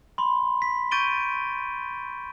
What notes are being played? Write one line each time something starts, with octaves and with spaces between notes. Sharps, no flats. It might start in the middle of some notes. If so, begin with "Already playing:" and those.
B5 C6
B6
C#6 G6 A6 D7 D#7 G7